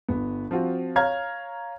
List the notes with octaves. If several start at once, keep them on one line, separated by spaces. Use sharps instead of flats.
G1 B3
F3 C4 F4 F#4
C#5 F5 A#5 F6 G#6